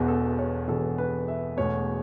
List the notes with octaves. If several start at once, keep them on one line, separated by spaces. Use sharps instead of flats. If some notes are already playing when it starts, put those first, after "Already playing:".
Already playing: E1 E2 B2 B4
A4
C#5
E1 E2 B2 A4
B4
E5
E1 E2 B2 A3 C#5